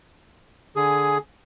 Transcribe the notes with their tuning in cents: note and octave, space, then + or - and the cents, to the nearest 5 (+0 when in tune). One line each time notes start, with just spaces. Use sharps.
D3 +0 G#4 +10 G#5 +0